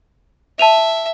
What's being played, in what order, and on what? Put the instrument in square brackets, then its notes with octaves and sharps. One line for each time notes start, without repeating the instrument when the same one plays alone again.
[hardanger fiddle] E5 [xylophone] A5 D#7 F7